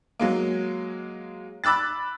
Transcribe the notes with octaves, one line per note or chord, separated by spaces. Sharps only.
F#3 G#3 A#3
B5 D6 E6 F#6 A6